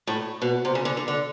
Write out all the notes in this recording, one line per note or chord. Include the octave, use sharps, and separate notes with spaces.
A2
B2
C3
C#3
D3
D3
D3